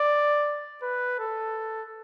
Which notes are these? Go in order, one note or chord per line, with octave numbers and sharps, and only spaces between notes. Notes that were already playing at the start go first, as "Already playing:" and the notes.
Already playing: D5
B4
A4